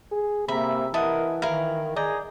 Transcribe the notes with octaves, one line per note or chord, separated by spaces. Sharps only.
G#4
C3 A#3 E5 A#5 B5
E3 E4 A#4 D#5 F#5 A5
D#3 E4 A#4 F5
G#4 D5 D#5 A#5 G6